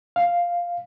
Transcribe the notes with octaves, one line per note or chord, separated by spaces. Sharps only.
F5